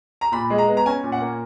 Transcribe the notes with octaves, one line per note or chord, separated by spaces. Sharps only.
A#5
A#2 B5
G#3
A#5
B3
A#5
C#4 G#5
A#2
F#5
A#3